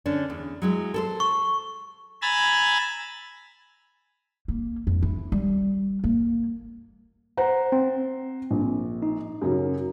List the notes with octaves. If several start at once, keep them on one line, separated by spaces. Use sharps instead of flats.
D3 C#4 D4
E2
F#3 G#3 E4
A4 A#4 C5
C#6
G#5 A#5 B5 E6 A6
A#3
F2
E4
G3
A#3
C5 F#5 A#5
C4
A#1
D#4
F#2 C#3 F#3